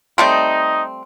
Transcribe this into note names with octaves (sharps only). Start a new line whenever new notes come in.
G3 A3 C4 D#4